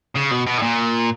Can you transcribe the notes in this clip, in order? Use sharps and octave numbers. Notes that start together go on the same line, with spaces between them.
C#3
B2
B2
A2
A#2